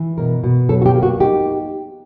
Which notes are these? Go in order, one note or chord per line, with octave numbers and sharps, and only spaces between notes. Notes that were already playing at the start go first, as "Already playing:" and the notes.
Already playing: E3
B2 A#4
B2
F#3 A4
F#4
G4
A#3
F#4
D#4 G4